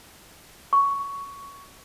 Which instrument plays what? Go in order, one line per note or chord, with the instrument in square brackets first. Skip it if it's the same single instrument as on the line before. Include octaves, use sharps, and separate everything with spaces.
[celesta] C#6